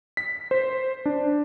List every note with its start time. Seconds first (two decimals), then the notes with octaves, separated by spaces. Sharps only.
0.17 B6
0.51 C5
1.06 D4